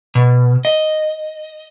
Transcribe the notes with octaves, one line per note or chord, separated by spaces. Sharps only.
B2
D#5